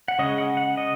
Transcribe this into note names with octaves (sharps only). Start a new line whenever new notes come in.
F#5
C#3 G#3 C#4 D#5
F#5
F#5
D#5